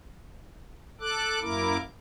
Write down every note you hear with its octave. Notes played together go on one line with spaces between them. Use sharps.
A4 D6 F#6
F#2 A#3 E4 A#4 D6